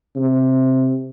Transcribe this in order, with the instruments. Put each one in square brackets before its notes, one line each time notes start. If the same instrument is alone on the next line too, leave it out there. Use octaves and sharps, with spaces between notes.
[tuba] C3